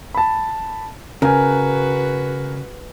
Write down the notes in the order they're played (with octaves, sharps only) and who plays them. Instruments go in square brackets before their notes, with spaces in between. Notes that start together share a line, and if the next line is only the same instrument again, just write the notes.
[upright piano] A5 B5
[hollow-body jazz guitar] C#3 [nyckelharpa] F#4 B4 [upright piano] A#4 G#5